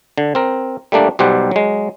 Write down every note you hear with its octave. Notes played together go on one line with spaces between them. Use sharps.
D3
C4 A#4
G3 A3 A#3 D4
B1 B2 G3 G4 C5 F#5
F#3 G#3